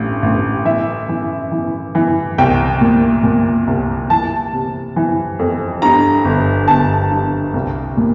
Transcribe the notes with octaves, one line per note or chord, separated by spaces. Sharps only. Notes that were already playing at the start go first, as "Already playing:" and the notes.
Already playing: A1 G2
A1
E3 E5
E3
E3
E3
C2 G5
A#2
A#2
C2
E3 A5
C3
E3
F2
G2 A#5
G1
G1 A5
G2
C2
A#2